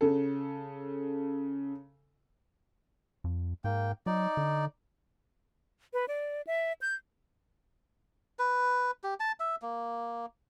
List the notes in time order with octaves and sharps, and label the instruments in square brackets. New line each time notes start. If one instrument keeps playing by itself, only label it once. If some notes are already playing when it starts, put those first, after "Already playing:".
[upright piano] C#3 A4
[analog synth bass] F2
[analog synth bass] G#2 [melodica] A#3 G5
[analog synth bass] F#3 [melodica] D#4 D5
[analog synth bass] D3
[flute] B4
D5
E5
G6
[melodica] B4
G4
A5
E5
A#3